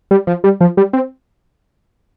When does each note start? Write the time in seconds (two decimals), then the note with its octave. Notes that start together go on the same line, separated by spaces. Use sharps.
0.11 G3
0.27 F3
0.44 G3
0.61 F3
0.77 G3
0.93 C4